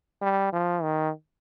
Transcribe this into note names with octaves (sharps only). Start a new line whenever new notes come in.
G3
F3
D#3